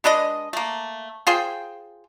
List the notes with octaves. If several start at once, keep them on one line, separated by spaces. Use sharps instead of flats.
G#3 D4 B4 D#5
A3 A#3
F4 G#4 C5 G5